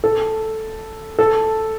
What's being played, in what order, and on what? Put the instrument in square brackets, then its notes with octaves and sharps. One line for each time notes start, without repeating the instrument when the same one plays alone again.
[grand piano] A4
A4